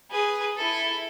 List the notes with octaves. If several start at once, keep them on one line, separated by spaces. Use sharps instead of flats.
G#4 B4
E4 A4